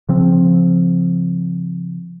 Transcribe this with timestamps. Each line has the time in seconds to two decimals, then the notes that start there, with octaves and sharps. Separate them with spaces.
0.09 C#3 F3 C4